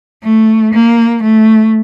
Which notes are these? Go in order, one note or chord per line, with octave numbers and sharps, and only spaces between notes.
A3
A#3
A3